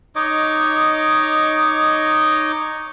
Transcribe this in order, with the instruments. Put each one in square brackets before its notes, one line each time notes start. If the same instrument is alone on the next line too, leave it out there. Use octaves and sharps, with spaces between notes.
[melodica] D#4 C#5 D#5 D6